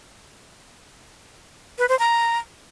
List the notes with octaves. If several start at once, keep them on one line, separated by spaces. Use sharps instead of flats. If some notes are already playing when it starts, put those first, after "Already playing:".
B4
C5
A#5